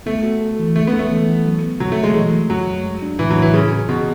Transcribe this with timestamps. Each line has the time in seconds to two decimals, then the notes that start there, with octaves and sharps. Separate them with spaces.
0.06 A3 B3
0.23 F#4
0.41 A4
0.59 E3
0.76 G#3 A3
0.87 B3
0.93 C#4
0.99 A3
1.11 E3
1.28 E3
1.46 F#3
1.62 B3
1.80 B2 F#3
1.92 A3
1.98 B2
2.03 G#3
2.15 E3
2.32 A3
2.50 F#2 F#3
2.66 F#2
2.84 G#3
3.02 D4
3.19 A2 E3
3.31 F#3
3.37 A2 E3
3.53 C#3 F#3
3.72 C#4
3.89 B2 G#4